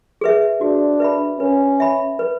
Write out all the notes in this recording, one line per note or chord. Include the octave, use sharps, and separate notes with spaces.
G#4 B4 E5
D4 F#4
B4 E5 B5
C#4 B4
E5 B5
B4